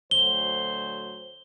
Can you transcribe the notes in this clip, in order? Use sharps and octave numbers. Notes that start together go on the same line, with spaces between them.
D2 F#3 C5 G7